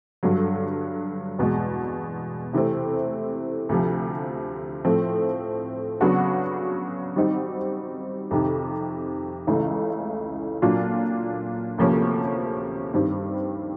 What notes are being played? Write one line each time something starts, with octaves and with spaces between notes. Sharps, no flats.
G2 D3 F#3
E2 B2 G#3
C3 E3 A3 C4
D2 C3 F3
A2 F3 A3 C4
C#3 F#3 B3 D4 F#4
D#3 G3 C4 D#4 F#4
F2 C3 D#3
C#2 C#3 E3 A3
A#2 F#3 A#3 D4 F4
D2 C3 F3 A#3 C#4
G2 D#3 G3 C4